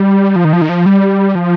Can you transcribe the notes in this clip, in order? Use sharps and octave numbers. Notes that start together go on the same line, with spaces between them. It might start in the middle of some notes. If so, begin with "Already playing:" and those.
Already playing: G3
F3
D#3
F3
D#3
F3
G3
F3